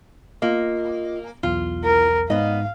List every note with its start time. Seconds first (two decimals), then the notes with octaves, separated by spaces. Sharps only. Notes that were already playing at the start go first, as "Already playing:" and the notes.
0.42 A#3 F4 D#5
1.43 B1 E2 F4
1.84 A#4
2.30 G#2 B3 D#5 F5